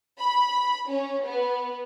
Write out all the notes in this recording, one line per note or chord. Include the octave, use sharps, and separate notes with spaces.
B5
C#4
B3